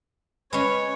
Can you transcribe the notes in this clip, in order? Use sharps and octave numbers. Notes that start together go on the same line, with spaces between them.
G#3 C#4 B4 C#5